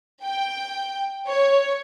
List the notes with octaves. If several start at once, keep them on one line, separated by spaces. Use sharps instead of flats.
G5
C#5